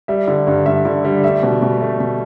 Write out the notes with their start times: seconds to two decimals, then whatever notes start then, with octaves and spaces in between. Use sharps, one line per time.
0.08 G3 E5
0.28 D3
0.47 G2
0.66 G2 E5
0.85 D3
1.05 G3
1.24 A3 E5
1.43 B2
1.62 B2
1.81 A3
2.00 B2